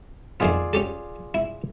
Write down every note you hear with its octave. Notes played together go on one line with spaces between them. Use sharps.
F2 D#3 B3 F4 G#4 D5
C#4 G4 A4
E4